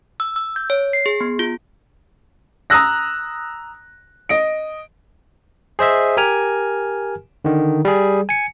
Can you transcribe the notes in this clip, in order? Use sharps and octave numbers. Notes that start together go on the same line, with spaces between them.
E6
E6
G6
C#5
C7
G#4
B3
F4
A#5 D#6 E6 F#6 A#6
D#5 D7
G#4 C5 D#5 E5
G4 A#4 G#5 F6
D3 D#3
G3 G#4
G#5 C#7